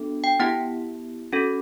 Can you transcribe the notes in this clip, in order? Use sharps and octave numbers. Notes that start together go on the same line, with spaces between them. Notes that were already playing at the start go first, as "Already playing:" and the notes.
Already playing: B3 D4 F#4 A4
G5
B3 E4 G4 F#5
C#4 F#4 A4